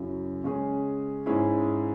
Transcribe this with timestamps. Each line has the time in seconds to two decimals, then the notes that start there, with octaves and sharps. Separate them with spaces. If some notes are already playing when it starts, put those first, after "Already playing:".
Already playing: F#2 C#3 F#3 C#4 E4
0.44 C#3 G#3 C#4 G#4
1.26 G#2 G#3 C#4 E4 G#4